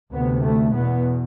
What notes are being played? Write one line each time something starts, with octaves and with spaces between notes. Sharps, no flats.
D2 C3 B3
A3
E2 B2 B3